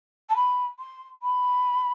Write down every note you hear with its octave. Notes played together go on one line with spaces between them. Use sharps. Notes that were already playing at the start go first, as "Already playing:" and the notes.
A5
B5
C6
B5